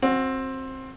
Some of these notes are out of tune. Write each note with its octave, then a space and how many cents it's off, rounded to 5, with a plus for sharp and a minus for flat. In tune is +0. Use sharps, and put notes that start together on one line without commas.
C4 +15 F#4 -20